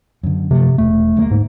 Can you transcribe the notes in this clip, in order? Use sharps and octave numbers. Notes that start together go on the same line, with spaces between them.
F#2 D3
F#2 C3 F3 A3
E1 A3
D2 G#3 A#3
G#2